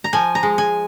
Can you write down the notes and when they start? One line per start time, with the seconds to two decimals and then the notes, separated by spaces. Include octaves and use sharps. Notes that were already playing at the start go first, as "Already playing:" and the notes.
0.04 A#5
0.13 F3 G#5
0.35 A#5
0.43 G#3
0.58 G#5